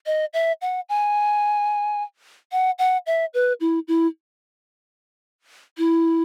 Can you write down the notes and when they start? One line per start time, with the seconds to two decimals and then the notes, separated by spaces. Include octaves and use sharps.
0.06 D#5
0.33 E5
0.61 F#5
0.89 G#5
2.52 F#5
2.79 F#5
3.06 E5
3.34 B4
3.60 E4
3.88 E4
5.78 E4